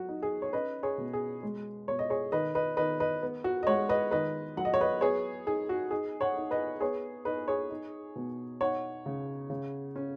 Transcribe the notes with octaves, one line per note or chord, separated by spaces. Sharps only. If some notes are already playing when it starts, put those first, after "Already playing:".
Already playing: F#3 F#4
D#4
G#4
C#5
C#4 B4 D#5
G#4 C#5
B2
G#4
G#3
B2 C#5
D#5
G#4 C#5
D#3 B4 D#5
B4 D#5
D#3 B4 D#5
B4 D#5
B3
F#4
D#5
G#3 C#5 F#5
B4 D#5
D#3 B4 D#5
F#3 F#5
D#5
C#5
B4 D#5
B3 G#4 C#5
D#4 G#4
F#4
D#4 G#4
C#5 F#5
D#4
B4 D#5
B3 G#4 C#5
D#4 B4 D#5
G#4 C#5
D#4
B2
D#4 C#5 F#5
C#3
C#3
C#4